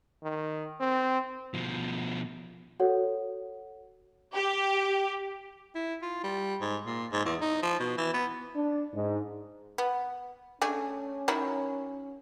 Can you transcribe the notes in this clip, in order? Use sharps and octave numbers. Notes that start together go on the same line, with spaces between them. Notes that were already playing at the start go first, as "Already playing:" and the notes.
D#3
C4
B2 F3
F#4 A4 C#5 F#5
G4
E4
F4
G3
G#2
A#2
G#2
E2
D#4
F3
B2
E3
B3
D4
G#2
B3
A3 C#4 D4 G#4
D#3 F#3 E4